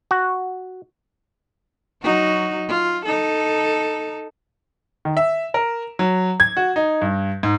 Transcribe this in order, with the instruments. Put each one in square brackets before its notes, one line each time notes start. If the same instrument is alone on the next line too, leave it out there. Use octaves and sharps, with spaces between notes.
[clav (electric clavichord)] F#4
[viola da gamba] F#3 D#4 F#4
F4
D#4 A4
[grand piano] D#3
E5
A#4
F#3
G#6
F#4
D#4
G2
G#2